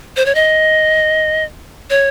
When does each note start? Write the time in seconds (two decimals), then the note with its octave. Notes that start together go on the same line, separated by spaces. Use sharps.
0.17 C5
0.26 C#5
0.35 D#5
1.90 C#5